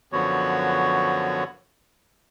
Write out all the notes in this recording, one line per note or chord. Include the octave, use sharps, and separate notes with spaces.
F#2 D3 F3 B3 F#4 C#5